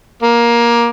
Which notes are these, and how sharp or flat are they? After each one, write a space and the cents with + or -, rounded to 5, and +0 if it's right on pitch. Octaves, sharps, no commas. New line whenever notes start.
A#3 +15